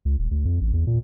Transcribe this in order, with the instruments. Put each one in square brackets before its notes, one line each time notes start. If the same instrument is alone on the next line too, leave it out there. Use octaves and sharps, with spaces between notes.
[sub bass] C#2
D#1
D2
F2
A1
E2
A#2